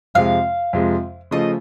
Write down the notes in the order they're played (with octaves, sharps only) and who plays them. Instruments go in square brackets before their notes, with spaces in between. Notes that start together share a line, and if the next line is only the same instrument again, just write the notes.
[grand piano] F2 C3 F3 G#3 [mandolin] F5
[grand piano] F2 C3 F3 G#3
[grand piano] C#3 F3 A3 [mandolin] D#5